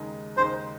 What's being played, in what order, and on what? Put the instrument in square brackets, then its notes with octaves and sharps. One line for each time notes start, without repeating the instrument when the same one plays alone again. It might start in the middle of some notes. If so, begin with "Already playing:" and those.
Already playing: [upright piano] D#2 C#3 G#3 D#4
[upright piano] D#2 C#3 G#3 D#4 [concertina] C5